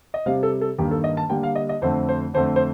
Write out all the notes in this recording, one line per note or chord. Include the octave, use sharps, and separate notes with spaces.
D#5
C3 G3 C4 F5
A4
A4
G2 D#3 A#3 G4
A4
D#5
A5
D3 G3 A#3 G5
F5
D#5
D#5
F2 D3 A3 C4 C5
C5
F2 D3 A3 C4 C5
C5